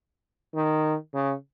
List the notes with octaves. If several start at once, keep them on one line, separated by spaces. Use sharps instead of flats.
D#3
C#3